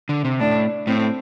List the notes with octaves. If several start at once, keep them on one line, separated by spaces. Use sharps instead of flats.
D3
C3
A2 D4
A2 C4